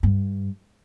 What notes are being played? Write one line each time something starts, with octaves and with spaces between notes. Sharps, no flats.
G2